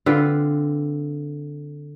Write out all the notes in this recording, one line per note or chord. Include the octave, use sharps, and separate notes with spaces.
D3 C4 F4 B4